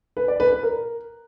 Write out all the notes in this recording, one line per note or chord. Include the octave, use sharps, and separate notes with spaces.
B4
D5
B4
B4
A#4